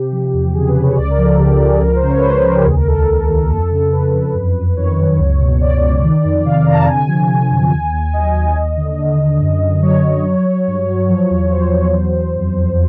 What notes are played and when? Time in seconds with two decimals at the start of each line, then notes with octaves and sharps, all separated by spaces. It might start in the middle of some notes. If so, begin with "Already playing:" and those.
Already playing: C3 G4
0.12 F3
0.34 E2
0.54 C#3 G#4
0.68 B4
0.76 C#3
0.83 C#5
0.97 C#2 D5
1.10 A#4
1.18 F3
1.24 A4
1.38 C#3 G4
1.53 G4
1.60 F3
1.67 G#4
1.81 C#2 A#4
1.96 C5
2.02 C#3
2.09 C#5
2.17 B4
2.23 C#2 C5
2.34 B4
2.44 C#2 A#4
2.55 G4
2.65 D#2 G#4
2.76 A#4
2.87 D#2 A4
2.97 A#4
3.08 D#2
3.29 D#2
3.43 A#4
3.50 F2 A4
3.70 C#3 A4
3.92 F2 B4
4.13 F2
4.35 F#2
4.55 F#2
4.76 D#3 C#5
4.97 F#2
5.18 C#2
5.40 B2
5.60 C#2 D5
5.81 C#2
6.03 D#3
6.25 F2
6.45 C3 F5
6.66 C3 A#5
6.73 A5
6.87 D3 G#5
7.08 F3
7.29 D3
7.51 F#2
7.72 D#2
7.93 D#2
8.13 F#3 D#5
8.35 D#2
8.56 D#2
8.77 D3
8.99 D3
9.19 D3
9.40 F#2
9.61 F#2
9.82 F#3 C#5
10.04 F#2
10.25 F#3
10.46 F#3
10.68 G2
10.88 F#3
11.09 F3
11.31 E2
11.51 E2 C5
11.72 E2
11.94 F#3
12.15 F#3
12.36 F2
12.57 F2